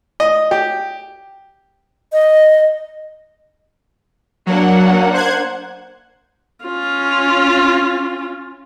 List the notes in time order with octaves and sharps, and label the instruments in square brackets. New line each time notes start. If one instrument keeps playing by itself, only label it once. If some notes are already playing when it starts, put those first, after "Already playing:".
[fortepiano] D#5
G4
[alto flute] D#5
[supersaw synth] F#3 [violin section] A#3 D4 F#5
[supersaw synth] C5 F#6 G#6
[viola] C#4 F4